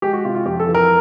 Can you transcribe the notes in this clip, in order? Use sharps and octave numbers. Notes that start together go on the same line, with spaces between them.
G#3 G4
F#4
C3 F4
F4
F2 G4
A4
E3
A#4